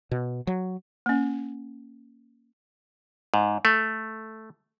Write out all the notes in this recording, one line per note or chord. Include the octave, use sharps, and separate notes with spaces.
B2
F#3
A#3 C#4
G#2
A3